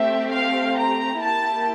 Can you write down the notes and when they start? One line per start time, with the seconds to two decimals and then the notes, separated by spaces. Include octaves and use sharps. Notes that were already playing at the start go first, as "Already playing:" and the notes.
Already playing: A3 C4 G4 E5
0.31 F5
0.77 A#5
1.23 A#3 E4 G4 A5